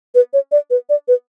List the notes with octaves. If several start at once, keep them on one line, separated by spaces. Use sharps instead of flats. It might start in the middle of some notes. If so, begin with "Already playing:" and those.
B4
C#5
D5
B4
D5
B4